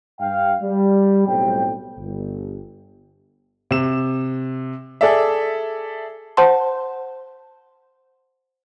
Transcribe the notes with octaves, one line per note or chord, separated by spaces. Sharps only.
G2 F5 G5
G3
B1 A2 C4 G5
G1
C3 E7
G#4 A4 D5 E5
C5 F#5 A5 C6